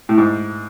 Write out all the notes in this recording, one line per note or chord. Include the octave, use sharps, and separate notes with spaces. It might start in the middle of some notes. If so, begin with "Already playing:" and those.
A2
G#2